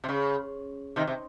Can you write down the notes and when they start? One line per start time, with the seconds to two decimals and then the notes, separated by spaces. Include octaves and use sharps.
0.04 C3
0.09 C#3
0.96 C3 D#3
1.07 C3